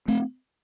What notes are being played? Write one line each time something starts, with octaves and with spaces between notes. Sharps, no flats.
A3 C4